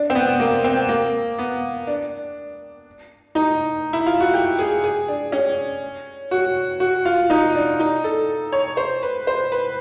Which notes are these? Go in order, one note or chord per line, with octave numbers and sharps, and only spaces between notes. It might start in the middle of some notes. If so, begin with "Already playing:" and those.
Already playing: D4
C4
B3
A#3
C4
A#3
B3
D4
D#4
E4
F4
F#4
G4
G#4
G#4
D4
C#4
F#4
F#4
F4
D#4
D4
D#4
A4
C#5
C5
B4
C5
B4